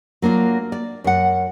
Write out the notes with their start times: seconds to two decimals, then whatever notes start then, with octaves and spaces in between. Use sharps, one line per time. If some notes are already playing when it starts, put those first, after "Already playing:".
0.22 F#3 A#3 D4 F4
0.72 D5
1.04 F#2 F#5